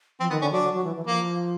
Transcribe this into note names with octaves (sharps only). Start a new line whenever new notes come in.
F3 C4
D#3 B3
D3 C#4
F#3 D4
F#3
F#3
E3
E3
F3 A#3